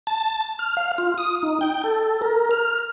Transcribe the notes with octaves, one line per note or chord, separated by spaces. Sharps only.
A5
F6
F5
F4
D#6
D#4
G5
A4
A#4
F6